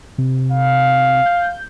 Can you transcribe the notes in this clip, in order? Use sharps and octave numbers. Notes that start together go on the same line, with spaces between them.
C3
F5
G6